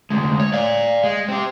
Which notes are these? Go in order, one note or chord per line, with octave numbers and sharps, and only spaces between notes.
D2 G#3
C#5
D5 F5
G#3
C4 G4